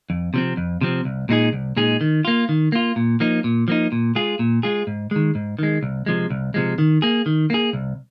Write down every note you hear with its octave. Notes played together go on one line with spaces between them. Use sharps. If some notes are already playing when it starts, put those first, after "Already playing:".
F2
C3 F3 C4
F2
C3 F3 C4
C2
A#2 G#3 D#4 G#4
C2
A#2 G#3 D#4 G#4
D#3
A#3 F4
D#3
A#3 F4
A#2
F3 A#3 D#4
A#2
F3 A#3 D#4
A#2
G#3 F4 G#4
A#2
G#3 F4 G#4
G#2
D#3 G#3
G#2
D#3 G#3
C2
C3 F3 G#3
C2
C3 F3 G#3
D#3
A#3 G#4
D#3
A#3 G#4
C2